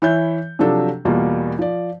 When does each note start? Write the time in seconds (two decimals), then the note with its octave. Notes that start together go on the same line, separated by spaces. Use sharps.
0.02 E3 E4 C#5 E5 G6
0.59 C3 F3 F#3 D4 A4
1.05 E2 B2 G3 A#3 F4
1.59 F3 D5